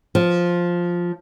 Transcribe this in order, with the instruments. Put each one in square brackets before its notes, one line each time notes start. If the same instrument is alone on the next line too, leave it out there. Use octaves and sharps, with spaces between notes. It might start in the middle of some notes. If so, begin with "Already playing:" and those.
[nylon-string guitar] F3